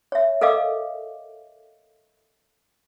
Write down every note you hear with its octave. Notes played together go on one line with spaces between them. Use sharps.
C#5 E5
A4 A#4 D#5 F5 D6